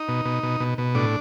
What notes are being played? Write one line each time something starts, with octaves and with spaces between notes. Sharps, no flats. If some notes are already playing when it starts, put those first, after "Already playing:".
Already playing: D#4
B2
B2
B2
B2
B2
A2 D4